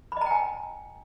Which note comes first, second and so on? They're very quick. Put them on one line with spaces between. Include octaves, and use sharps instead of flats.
B5 D#5 A#5 G5 G#5